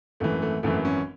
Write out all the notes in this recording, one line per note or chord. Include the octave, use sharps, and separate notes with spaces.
G#1 F#2 E3 A3
A3
G#1 F#2 E3 A3
C#4